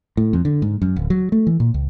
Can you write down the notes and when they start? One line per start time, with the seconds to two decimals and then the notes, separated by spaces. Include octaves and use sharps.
0.17 A2
0.33 F2
0.45 D3
0.62 G#2
0.82 F#2
0.96 D1
1.10 F#3
1.32 A3
1.47 E3
1.60 A#2
1.74 C#2